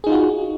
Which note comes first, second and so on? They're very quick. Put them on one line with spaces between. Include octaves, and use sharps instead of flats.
G#4 D#4 F4 F#4